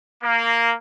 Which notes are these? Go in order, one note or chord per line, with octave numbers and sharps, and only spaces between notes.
A#3